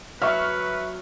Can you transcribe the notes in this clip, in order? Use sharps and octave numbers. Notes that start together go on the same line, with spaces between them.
F#3 B4 E5 C#6 F6